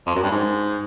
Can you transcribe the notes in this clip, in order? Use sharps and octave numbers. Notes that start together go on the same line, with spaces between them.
F2
F#2
G2
G#2